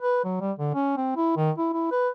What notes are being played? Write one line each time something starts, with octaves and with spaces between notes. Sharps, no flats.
B4
F#3
G3
D3
C#4
C4
E4
D#3
E4
E4
B4